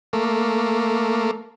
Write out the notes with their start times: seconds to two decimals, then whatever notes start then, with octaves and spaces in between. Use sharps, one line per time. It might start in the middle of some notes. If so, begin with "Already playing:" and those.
0.13 A3 A#3